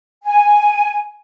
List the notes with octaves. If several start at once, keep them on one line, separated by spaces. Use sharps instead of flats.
G#5